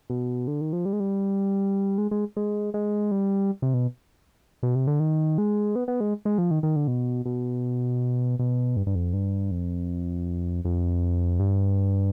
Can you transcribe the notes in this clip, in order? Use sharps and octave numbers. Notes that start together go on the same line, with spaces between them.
B2
D3
D#3
F3
G3
G#3
G3
G#3
G#3
G#3
G#3
G3
C3
B2
B2
C3
D3
D#3
G#3
B3
B3
G#3
G#3
F3
D#3
D#3
D3
B2
B2
B2
G2
G2
F2
G2
F2
F2
G2